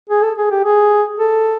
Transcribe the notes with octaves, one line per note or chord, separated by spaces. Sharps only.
G#4
A4
G#4
G4
G#4
A4